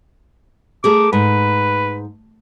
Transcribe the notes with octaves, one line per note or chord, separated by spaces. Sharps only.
A3 G#4 A#4 D6
G#2 B4